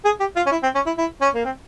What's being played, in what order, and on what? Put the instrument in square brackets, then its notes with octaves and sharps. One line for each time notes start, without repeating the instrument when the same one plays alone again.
[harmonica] G#4
G4
F4
C#4
E4
C4
C#4
E4
E4
C#4
A#3
C4